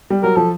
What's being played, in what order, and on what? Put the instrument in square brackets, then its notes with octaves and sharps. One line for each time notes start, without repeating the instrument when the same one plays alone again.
[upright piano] G3
[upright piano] F#3 [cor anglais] A#4
[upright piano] F3 [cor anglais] A4